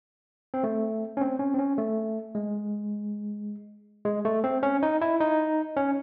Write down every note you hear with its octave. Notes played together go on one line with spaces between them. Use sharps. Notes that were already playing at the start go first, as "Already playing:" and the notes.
C4
A3
C#4
C4
C#4
C4
C#4
A3
G#3
G#3
A3
C4
C#4
D#4
E4
D#4
C#4